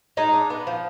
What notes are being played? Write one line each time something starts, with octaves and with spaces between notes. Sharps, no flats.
G#3 D#4
D4
B3
F3